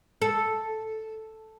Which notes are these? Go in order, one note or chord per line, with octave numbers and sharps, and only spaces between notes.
A4